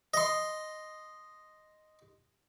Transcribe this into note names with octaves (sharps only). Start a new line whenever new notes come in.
D#5 C6